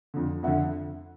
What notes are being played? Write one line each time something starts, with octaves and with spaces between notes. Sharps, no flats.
F2 D3
F2 D3 E5 F#5